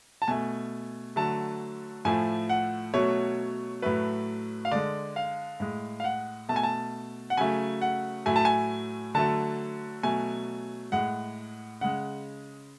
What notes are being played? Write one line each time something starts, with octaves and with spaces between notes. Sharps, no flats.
A5
B2 A3 G#5
D3 F#3 A3 A5
A2 F3 A3 G#5
F#5
B2 F#3 A3 C#5
A2 F#3 A3 B4
F5
D3 G#3 D5
F5
A2 G#3
F5
F#5
B2 A3 A5
G#5
A5
F#5
C#3 F#3 A3 G#5
F#5
A2 F#3 A3 G#5
A5
G#5
D3 F#3 A3 A5
B2 F#3 A3 G#5
A2 G#3 F#5
C#3 G#3 F#5